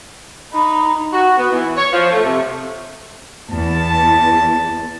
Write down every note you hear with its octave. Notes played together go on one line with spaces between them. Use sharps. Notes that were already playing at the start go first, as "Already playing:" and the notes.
D#4 B5
F#4
B3
E3
C#5
F3
A3
C3
E2 A5